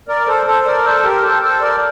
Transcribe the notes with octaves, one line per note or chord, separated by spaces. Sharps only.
A#4 D5
A4 C5
A4 C5
A#4 D5
A4 C5
G4 A#4
A4 C5
A4 C5
A#4 D5